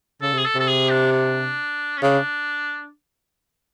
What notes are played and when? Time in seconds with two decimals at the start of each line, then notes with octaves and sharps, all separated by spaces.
0.22 C#3 A4
0.33 C3
0.38 G#4
0.45 A4
0.55 C3 A4
0.68 G#4
0.90 D4
1.12 D4
1.98 C#4
2.02 C#3 D4